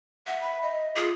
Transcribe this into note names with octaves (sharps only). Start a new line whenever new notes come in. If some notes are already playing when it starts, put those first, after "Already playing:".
E5 F#5
B5
D#5
F4 G#4